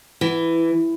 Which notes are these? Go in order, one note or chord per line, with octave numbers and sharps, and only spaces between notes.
E3